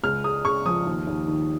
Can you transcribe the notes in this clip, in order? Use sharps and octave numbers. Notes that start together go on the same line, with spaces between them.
C#2 F6
G#3 D#6
C#3 C#6
F3 D#6
D#2
D#2
D#3